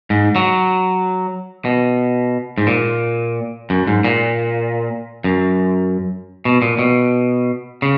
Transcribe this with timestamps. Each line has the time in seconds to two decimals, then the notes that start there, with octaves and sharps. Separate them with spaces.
0.10 G#2
0.36 F#3
1.65 B2
2.58 G#2
2.67 A#2
3.70 F#2
3.87 G#2
4.05 A#2
5.24 F#2
6.45 B2
6.62 A#2
6.79 B2
7.82 C#3